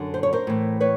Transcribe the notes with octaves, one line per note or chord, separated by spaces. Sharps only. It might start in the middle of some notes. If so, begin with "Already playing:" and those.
Already playing: F#2 D3
C5
C#5
A#4 C5
A2 E3
B4 C#5